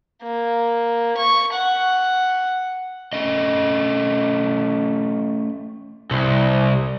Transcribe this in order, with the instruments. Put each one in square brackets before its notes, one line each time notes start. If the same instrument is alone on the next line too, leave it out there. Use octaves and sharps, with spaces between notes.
[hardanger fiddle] A#3
C#6
F#5
[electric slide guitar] A3 C#4 D#5
[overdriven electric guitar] C2